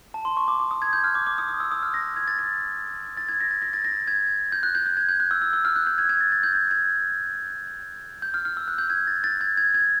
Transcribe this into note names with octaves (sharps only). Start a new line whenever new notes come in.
A5
C6
C#6
D6
D6
D#6
G#6
G6
F6
D6
D6
D#6
D#6
E6
D#6
F6
A#6
G#6
A6
A6
A6
G#6
A#6
A6
A#6
A6
A#6
G#6
G6
F#6
G6
G6
G#6
G6
F#6
E6
E6
E6
F6
F#6
G6
G#6
G#6
A6
A6
G6
G#6
G#6
G6
F6
F6
E6
F#6
G6
G#6
A6
A6
G#6
G#6
G#6